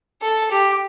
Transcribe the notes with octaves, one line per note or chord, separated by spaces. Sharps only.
A4
G4